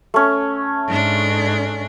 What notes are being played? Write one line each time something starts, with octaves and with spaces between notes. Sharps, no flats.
A3 C#4
G#2 D4